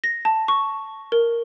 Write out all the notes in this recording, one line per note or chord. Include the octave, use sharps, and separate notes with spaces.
A#6
A5
C#6
A#4